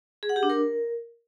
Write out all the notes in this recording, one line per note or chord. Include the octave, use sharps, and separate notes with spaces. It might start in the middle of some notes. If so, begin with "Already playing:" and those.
G#4
F#5
G4
D4
A#4